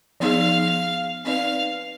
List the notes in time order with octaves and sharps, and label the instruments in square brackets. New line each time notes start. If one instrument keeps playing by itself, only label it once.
[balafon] F3 B3 D#4 G#4 [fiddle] F5
[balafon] C4 D#4 B4 D5 [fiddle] F5